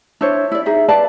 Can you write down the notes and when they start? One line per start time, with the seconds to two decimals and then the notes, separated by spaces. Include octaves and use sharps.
0.21 D4 E4 C5 C#5
0.52 E4 D5
0.66 D#4 G#4 E5
0.89 B4 D5 F5 A5